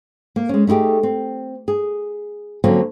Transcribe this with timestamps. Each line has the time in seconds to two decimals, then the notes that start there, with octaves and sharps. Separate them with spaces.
0.36 A#3
0.49 G#3 C#4
0.67 A3 D#4 E4 G4 G#4
1.03 C4
1.68 G#4
2.64 D3 F3 F#3 A#3 C4 C#4